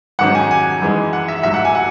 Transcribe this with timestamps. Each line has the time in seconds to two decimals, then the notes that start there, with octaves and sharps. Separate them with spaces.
0.19 G#2 D#3 F#3 C#4 F#5
0.35 G#5
0.51 G#5
0.82 F#2 E3 G#3 D#4
1.13 F#5
1.28 E5
1.43 A1 G#2 F#3 E5
1.54 F#5
1.65 G#5
1.75 F#5